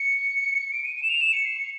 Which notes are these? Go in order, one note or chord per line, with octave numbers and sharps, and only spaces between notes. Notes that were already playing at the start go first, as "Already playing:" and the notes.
Already playing: C#7
D7
D#7
D#7
E7
F7
E7
C#7
C7
C#7